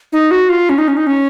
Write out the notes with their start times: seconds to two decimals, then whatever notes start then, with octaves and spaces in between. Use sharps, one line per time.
0.12 D#4
0.31 F#4
0.49 F4
0.69 C#4
0.78 D#4
0.88 C#4
0.97 D#4
1.07 C#4